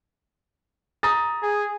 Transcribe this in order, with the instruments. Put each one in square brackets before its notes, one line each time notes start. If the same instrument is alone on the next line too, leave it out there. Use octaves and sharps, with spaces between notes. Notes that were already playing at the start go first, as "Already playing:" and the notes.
[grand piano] A#5 D#6 A6
[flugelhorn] G#4